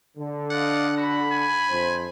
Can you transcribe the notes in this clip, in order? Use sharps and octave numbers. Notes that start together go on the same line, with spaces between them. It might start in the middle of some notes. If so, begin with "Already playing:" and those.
D3
D5 D#5 F5 F#5
F#4 B5
G#5
F2 C5